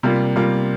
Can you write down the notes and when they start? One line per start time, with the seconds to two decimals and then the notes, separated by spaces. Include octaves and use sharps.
0.03 C3 G3 A#3 F4
0.36 C3 G3 A#3 F4